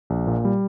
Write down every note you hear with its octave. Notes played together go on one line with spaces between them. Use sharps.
A#1
A#2
G3